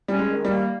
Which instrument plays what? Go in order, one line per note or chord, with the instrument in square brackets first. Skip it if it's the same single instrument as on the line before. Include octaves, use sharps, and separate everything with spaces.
[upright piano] G3 [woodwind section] C#4
[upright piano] G#3
[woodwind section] D#3
[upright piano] G3
[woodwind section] A#3